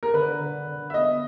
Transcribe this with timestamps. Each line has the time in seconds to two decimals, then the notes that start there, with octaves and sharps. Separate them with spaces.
0.03 A#4
0.14 D3 B4
0.40 D3
0.67 D3
0.90 E5
0.94 B3 D#5